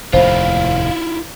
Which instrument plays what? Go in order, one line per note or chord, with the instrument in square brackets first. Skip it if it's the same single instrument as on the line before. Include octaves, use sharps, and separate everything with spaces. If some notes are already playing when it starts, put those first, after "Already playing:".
[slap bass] F1 D#2 A2 [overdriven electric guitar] E4 F4 [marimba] C5 [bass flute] F5